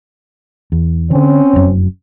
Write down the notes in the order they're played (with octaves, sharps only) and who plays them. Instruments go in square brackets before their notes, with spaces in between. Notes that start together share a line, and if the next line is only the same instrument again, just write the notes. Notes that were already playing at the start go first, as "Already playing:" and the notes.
[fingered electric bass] E2
[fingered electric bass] D3 D#3 [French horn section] C4 C#4
[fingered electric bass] F1 F#2